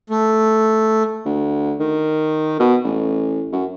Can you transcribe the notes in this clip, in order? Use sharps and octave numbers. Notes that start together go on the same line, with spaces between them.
A3
D2
D#3
B2
A1
F#2